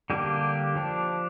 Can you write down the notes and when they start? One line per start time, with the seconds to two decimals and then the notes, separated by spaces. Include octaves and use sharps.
0.10 D3 G3 A#3 D4 G4
0.76 F3 D4